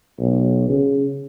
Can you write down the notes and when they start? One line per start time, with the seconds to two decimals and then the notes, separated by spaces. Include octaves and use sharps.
0.19 B1
0.69 C#3